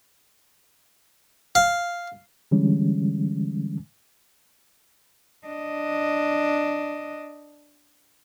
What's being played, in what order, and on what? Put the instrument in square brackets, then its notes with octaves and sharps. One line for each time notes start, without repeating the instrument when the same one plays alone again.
[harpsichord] F5
[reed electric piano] D3 E3 G3 G#3 C#4
[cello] D4 D#5